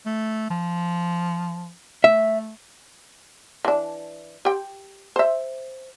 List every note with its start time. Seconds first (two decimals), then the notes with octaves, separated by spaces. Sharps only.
0.06 A3
0.50 F3
2.04 A3 E5
3.65 E3 D4
4.45 G4 G5
5.16 C5 E5